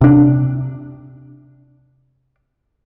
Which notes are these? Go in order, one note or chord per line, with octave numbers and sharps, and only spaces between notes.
C3 D4